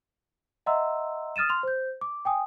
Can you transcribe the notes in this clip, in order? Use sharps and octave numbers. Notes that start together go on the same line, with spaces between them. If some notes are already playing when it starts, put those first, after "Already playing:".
D#5 E5 F#5 A#5 C6 E6
D#6 F6 A6 D#7 E7
C6 F6 F7
C5 G6
D6
G5 G#5 D#6